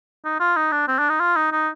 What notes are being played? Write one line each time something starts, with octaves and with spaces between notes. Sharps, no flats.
D#4
F4
D#4
D4
C4
D4
D#4
F4
D#4
D#4